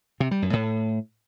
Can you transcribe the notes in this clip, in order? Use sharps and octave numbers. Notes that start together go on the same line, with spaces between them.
C3
G3
F#2
A2